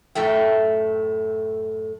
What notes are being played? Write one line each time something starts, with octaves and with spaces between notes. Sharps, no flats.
F#2 A2 A3 G5